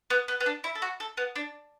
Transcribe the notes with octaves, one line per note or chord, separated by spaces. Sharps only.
B3
B3
B3
D4
E4
A4
F#4
A4
B3
D4